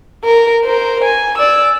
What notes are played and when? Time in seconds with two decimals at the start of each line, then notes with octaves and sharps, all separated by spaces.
0.24 A#4
0.64 A#4 C5
1.04 G#5
1.38 D5 E6